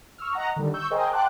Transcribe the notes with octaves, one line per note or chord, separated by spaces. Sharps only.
C#6 E6 F6
D#5 F#5 A#5
D3 D#3 G3
C#6 E6 G6
G#4 A#4 C5 D#5 G5 G#5
F#5 G5 A5 C6 D6 F#6